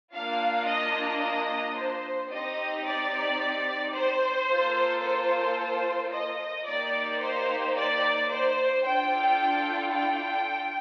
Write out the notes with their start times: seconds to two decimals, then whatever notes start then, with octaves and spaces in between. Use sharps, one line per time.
0.13 A#3 D4 F4 F5
0.67 D#5
1.22 D#5
1.77 C5
2.31 C4 D#4 G4 D#5
2.86 D5
3.95 C5
4.49 A#3 F4 A4
5.04 C5
6.13 D#5
6.67 A#3 D#4 G4 D5
7.22 C5
7.76 D5
8.31 C5
8.85 D4 F4 A4 G5
9.94 G5